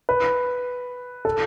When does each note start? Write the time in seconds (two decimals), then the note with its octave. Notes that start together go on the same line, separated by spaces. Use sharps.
0.09 B4
1.25 A4